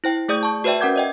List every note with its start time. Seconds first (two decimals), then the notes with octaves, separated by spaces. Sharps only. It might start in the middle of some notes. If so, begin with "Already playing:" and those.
0.04 E4 C5 G5
0.29 A3 G#4 D5 D#6 G6
0.43 A5 C#6
0.64 F#4 B4 C5 D5 E5 G5
0.81 C#4 A#4 F#5 D6 G6 G#6
0.96 D5 D#5 G5